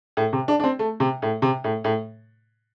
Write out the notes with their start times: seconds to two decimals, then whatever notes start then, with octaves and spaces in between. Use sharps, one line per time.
0.17 A2
0.33 C3
0.48 D4
0.60 D4
0.64 C4
0.79 A3
1.00 C3
1.22 A2
1.42 C3
1.64 A2
1.84 A2